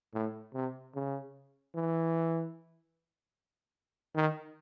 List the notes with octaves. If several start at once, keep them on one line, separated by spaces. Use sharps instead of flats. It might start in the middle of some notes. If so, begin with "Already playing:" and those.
A2
C3
C#3
E3
D#3